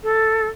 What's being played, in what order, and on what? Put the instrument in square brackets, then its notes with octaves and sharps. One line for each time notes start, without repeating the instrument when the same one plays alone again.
[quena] A4